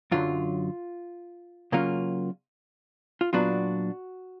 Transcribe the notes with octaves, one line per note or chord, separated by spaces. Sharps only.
F#2 D3 F#3 F4
C#3 F#3 A#3 C#4 F4
F4
A#2 F#3 B3 D4 F4 F#4